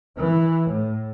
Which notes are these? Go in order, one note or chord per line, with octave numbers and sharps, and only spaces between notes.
E3
A2